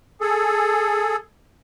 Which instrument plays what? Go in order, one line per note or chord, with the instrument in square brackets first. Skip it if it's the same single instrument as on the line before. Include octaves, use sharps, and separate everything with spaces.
[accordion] G#4 A4